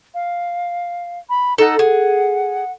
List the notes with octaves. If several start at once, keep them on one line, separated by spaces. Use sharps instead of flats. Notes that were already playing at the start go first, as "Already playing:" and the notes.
F5
B5
D#4 A4 F#5
G#4 F#5